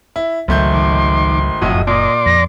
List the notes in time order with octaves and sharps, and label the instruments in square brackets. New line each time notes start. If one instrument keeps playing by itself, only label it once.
[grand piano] E4
[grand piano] G#1 A3 G6 [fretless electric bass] C#2 F#3 [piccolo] C6
[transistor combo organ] D#3 D6
[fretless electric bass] F#1 [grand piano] B1 A2 D#5 [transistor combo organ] F2 F#4 D#6
[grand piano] A#2 [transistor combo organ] D5 C6 D6 [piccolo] D#5
[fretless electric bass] F2 [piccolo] A#6